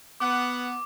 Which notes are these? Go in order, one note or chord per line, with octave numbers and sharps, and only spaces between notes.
B3 F#5 D6